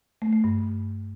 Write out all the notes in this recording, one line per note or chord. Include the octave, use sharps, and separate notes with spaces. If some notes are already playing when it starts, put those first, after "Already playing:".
A3
A3
G2